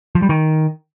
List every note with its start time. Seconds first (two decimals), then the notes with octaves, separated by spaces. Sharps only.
0.15 F3
0.22 G3
0.29 D#3